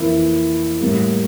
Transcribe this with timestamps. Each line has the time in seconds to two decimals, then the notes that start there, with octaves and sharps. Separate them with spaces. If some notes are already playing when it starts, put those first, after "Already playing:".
Already playing: F2 E3 A#3 E4
0.80 A2 G3 A#3